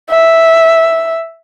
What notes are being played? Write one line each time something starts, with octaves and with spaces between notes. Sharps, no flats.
E5